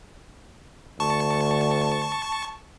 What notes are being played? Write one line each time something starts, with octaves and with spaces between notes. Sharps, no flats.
D2 A5 C#6